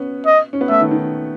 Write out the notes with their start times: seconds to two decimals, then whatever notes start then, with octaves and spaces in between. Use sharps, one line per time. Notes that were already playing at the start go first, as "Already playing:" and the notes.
Already playing: B3 C#4
0.26 D#5
0.53 C#4
0.61 B3
0.69 A3 E5
0.81 D#3
0.91 D#3